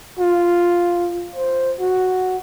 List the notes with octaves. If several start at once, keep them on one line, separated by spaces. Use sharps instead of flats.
F4
C5
F#4